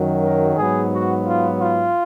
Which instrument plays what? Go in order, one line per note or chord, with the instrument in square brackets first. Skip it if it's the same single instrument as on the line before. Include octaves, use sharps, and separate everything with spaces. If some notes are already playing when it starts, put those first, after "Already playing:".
Already playing: [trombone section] F#2 D#3 F#3
A#4
G#2 F#3 B3 G#4
F#4
F4
F4